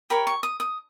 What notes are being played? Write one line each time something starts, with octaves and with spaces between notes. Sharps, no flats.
G4 A#4 C#5 B5
C#6
D#6
D#6